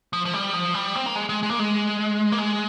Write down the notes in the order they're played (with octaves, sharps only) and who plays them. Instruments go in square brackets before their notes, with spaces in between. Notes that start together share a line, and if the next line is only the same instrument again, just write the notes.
[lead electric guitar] F3
F3
G3
F3
G3
C4
A#3
G#3
G#3
G#3
A#3
G#3
A#3
G#3